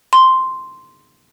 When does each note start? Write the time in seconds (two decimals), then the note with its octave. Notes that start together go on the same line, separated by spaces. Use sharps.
0.13 C6